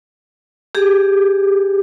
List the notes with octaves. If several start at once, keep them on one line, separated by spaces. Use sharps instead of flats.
G4 G#4